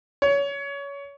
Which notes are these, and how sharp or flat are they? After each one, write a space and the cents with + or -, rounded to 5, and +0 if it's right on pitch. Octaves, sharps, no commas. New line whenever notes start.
C#5 +25